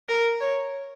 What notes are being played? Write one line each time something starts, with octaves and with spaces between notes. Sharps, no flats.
A#4
C#5